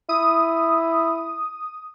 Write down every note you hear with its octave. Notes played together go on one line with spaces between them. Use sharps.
E4 D#6